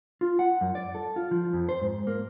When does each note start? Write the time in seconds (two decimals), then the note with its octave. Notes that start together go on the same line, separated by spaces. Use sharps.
0.21 F4
0.39 F#5
0.61 F#2
0.75 D5
0.95 A4
1.16 F4
1.31 F3
1.53 F2
1.69 C5
1.82 G#2
2.07 A#3